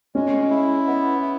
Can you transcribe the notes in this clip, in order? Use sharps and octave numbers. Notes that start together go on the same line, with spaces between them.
G#3 C#4
E4
B3
E4